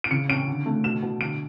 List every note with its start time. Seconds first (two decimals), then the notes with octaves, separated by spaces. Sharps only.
0.04 D7
0.11 C#3 C#7
0.29 C#4 D7
0.48 D3
0.66 A3
0.84 B2 E7
1.02 B2
1.20 D3 D7